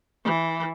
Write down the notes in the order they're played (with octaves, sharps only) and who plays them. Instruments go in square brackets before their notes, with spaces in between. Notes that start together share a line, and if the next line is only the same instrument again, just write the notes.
[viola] E3